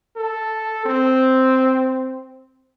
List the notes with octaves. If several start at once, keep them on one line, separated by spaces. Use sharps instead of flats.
A4
C4